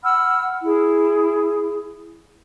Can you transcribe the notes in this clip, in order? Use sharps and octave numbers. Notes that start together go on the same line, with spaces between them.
F#5 B5 E6 F6
E4 G#4